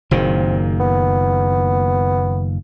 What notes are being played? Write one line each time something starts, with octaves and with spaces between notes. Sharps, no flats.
F#1 A#2 D#3 C4
B3